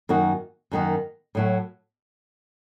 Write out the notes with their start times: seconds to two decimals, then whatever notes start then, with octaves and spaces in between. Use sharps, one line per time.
0.09 F#2 D#3 A#3 D#4 F#4
0.72 F#2 D#3 A#3 D#4 F#4
1.35 A2 F#3 A3